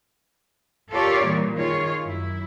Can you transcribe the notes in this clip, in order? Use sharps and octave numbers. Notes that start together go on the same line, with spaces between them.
F4 G4 A4 A#4 C#5 D5
A#2 E3 G3
D#3 F4 G#4 C#5
F#2 E4